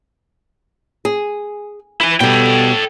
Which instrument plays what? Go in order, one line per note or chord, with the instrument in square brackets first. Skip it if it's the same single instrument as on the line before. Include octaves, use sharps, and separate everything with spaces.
[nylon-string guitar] G#4
[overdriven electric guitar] E4 G#5
[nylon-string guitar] B2 G3 [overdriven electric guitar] A4 G5